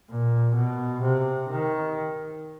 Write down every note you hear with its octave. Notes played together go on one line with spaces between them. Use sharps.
A#2
B2
C3
D#3